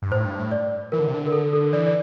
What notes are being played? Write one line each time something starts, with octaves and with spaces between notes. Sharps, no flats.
G2
A2 C5
G2
A2
D5
E3 A#4
D3
C3
D3
A#4
A4
A4
E3 D5
D5